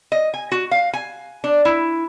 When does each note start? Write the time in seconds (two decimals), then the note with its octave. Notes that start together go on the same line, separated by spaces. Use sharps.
0.12 D#5
0.34 G#5
0.52 F#4
0.71 F5
0.93 G#5
1.44 D4
1.65 E4